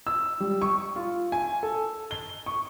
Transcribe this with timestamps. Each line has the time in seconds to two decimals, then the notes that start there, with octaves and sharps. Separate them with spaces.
0.07 E6
0.40 G3
0.62 C#6
0.96 F4
1.32 G#5
1.63 A4
2.11 G7
2.46 C#6